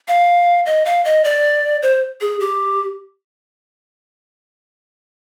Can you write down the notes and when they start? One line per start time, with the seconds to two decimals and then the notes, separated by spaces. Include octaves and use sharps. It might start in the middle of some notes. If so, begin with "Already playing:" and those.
0.08 F5
0.66 D#5
0.85 F5
1.05 D#5
1.24 D5
1.83 C5
2.21 G#4
2.40 G4